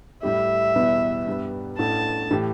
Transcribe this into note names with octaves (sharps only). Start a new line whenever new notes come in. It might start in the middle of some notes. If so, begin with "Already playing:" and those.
A2 G3 E4 G4 E5
E2 B2 G3 B3 E4
G2 G3 B3
A1 A2 A3 D4 A5
A2 E3 A3 G4